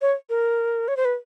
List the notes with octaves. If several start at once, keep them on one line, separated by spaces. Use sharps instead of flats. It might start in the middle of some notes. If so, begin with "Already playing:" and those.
C#5
A#4
C#5
C5
B4